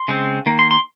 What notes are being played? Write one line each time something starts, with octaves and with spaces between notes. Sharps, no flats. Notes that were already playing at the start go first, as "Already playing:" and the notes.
Already playing: C6
C#3 G#3 C4
D#3 A#3
C6
C6